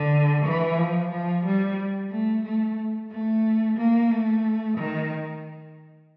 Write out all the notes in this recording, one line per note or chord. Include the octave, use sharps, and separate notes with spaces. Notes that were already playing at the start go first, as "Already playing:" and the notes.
Already playing: D3
E3
F3
F3
G3
A3
A3
A3
A#3
A3
D#3